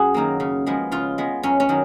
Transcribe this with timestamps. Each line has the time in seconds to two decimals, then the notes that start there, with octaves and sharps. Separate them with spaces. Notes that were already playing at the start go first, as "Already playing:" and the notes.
Already playing: F#2 F#4 G#4
0.14 D#3 F#3 A#3
0.40 C#3
0.67 F3 G#3 B3
0.92 C#3 F4
1.18 G#3 B3
1.43 F#2 C#4
1.60 C#4
1.69 D#3 F#3